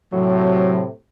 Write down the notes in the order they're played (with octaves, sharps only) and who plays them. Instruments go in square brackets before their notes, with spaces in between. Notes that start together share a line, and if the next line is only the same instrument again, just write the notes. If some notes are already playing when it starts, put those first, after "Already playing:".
[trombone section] A2 C3 [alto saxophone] F#3